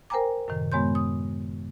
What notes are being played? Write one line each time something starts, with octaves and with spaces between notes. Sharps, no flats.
A#4 C5 G5 G#5 A#5 D6
F#2 A2 C3 D#3
F#2 G#3 B3 C#5 C6 G6
D#6